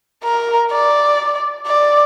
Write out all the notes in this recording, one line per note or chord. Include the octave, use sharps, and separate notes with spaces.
A#4
D5
D5